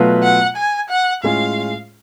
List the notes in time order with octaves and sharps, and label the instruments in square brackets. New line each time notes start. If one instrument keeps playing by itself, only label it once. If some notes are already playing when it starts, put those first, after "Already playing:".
Already playing: [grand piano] B2 F#3 A3 F4 B4
[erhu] F#5
G#5
F#5
[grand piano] A2 G#3 C#4 F4 [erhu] F5